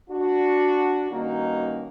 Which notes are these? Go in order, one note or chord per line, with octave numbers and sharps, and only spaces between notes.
D4 F#4
G2 D#3 A#3 C#4 D#4 F#4